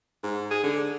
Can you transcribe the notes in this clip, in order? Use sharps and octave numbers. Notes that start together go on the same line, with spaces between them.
G#2
G#4
D3